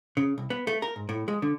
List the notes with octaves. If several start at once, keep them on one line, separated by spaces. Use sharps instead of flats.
C#3
C2
B3
A3
A#4
G#2
A2
G#3
D3